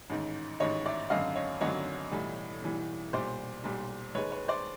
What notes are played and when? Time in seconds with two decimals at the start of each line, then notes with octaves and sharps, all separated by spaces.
0.10 A1 G#2 D#3
0.60 A1 G#2 D#3 C#5 D#5
0.86 D5 E5
1.10 G#1 F#2 D3 F#3 D#5 F5
1.35 C#5 D#5
1.61 G#1 F#2 D3 F#3 C#5 D#5
2.11 B1 A2 E3 G3
2.62 B1 A2 E3 G3
3.13 B1 A#2 G3 C5 D5
3.64 B1 A#2 G3
4.15 D#2 D#3 G#3 B4 C#5
4.32 B4 C#5
4.48 C5 D5